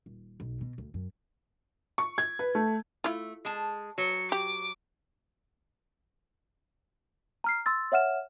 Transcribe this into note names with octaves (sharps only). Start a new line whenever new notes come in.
D#1
B1
B2
D2
F#2
C#6
G#6
B4
A3
A3 E4 F4
G#3 A5
F#3 C#7
G4 D6
A#5 F6 C7
C6 E6 A6
C#5 E5 F#5 F6 E7